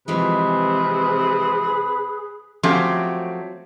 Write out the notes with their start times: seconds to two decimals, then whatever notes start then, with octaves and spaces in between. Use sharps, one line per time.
0.08 C3 E3 F3 G#3 G#4 B4
2.63 F3 F#3 A3 C4 C#4 G4